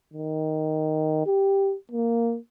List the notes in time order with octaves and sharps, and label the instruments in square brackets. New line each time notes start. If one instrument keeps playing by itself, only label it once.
[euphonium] D#3
G4
A#3